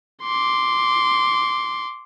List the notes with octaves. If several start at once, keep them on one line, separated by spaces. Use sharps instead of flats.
C6 D6